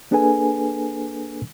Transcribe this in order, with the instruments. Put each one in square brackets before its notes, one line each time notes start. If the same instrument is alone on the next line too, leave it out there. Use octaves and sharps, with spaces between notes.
[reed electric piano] A#3 D4 G#4 A4 B4 G#5